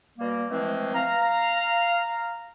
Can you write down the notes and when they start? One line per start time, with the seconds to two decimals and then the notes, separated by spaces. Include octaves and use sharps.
0.19 B2 G3 A#3
0.50 E3 F3 G#3 A3 C4
0.94 F5 A#5